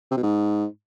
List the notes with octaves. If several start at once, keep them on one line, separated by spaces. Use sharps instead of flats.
C3
B2
G#2